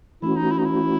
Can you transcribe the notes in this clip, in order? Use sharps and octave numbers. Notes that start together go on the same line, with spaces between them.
E3 A3 C#4 E4 F#4
D#4
E4
D#4
E4